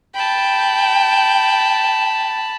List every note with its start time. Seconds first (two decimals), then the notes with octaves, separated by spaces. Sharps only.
0.15 G5 A5 B5